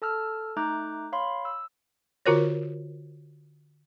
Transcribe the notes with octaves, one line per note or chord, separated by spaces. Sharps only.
A4 A5 E6 F6
A3 D#4 A#5 D6 F#6 G6
C#5 F5 B5 C6
E6
D3 F4 F#4 A#4 C5 C#5